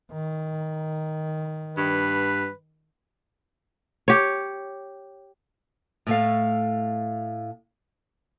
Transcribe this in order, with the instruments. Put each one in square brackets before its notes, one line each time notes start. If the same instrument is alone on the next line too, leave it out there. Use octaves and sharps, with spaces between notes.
[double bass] D#3
[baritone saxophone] G2 [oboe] B4
[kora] G4 C#5
[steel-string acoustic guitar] A2 A3 F5